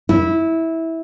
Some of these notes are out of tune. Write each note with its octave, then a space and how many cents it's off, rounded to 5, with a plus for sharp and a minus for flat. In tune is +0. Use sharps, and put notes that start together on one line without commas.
E4 -15